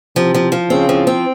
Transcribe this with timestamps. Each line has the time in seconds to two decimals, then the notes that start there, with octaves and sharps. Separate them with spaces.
0.16 C3 F3
0.34 F3
0.52 F3
0.70 C#3 C4
0.89 F3
1.07 C4